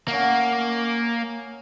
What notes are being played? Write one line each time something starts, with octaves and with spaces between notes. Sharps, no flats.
A#3 C#4 D#5 F#5